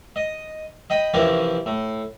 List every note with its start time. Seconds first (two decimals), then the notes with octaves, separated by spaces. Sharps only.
0.16 D#5
0.90 D#5 G5 B5
1.14 C3 E3 F3 C#4 G4 A#4
1.66 A2